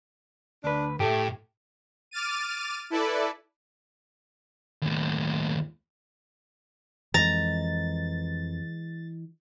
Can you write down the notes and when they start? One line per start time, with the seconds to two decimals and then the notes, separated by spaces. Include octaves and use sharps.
0.64 D2 D4 B4
1.00 A2 A3 G4
2.11 D6 F6 A6 D#7
2.90 E4 A4 B4 D5
4.82 D#2 A2
7.14 F2 E3 G#3 A#5 A6